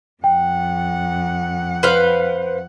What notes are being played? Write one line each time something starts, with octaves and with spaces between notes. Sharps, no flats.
F2 F#5 G5
B4 C5 F5